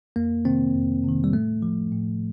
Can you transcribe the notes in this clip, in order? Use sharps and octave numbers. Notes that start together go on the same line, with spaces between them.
F2 A#3
C3 D#3 C4
F2
C3 D#3
G3
A2 A3
F3
A2